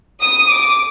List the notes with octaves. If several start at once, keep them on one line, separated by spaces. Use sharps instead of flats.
D#6
D6